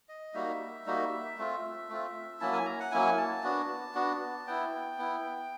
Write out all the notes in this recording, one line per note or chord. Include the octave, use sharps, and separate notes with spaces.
D#5
G3 A#3 D#4 F#4 E5
G3 A#3 D#4 F#4
A3 C4 F4
A3 C4 F4
F#3 A#3 C#4 E4 A5
G#5
A#5
F#5
F#3 A#3 C#4 E4 G#5
A5
B3 D4 F#4
B3 D4 F#4
B3 E4 G5
B3 E4